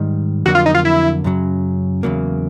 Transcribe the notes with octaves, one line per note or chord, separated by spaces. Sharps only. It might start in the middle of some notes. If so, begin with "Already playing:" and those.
Already playing: G#2 D#3 G3
F2 D3 F#3 A#3 F#4
F4
D#4
F4
E4
F#2 C#3 F#3
E2 C#3 F#3 A#3